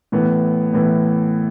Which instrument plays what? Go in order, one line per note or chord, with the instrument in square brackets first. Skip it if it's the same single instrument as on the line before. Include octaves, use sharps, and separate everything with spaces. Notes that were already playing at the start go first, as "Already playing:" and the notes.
[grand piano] A2 E3 B3
A2 E3 B3